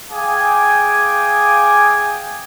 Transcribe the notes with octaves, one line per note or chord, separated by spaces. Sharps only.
G#4 F5 G5 G#5 D6 D#6